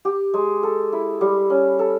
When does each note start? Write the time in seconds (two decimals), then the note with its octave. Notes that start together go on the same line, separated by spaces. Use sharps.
0.05 G4
0.34 G#3
0.63 A4
0.93 E4
1.21 G3
1.50 C#4
1.79 A4